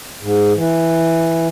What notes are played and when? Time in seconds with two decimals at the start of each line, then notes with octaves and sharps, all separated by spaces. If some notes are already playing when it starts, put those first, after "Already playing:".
0.22 G#2
0.56 E3